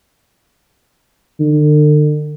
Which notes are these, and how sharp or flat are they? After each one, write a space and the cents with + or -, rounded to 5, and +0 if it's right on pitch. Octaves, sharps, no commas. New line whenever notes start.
D3 +40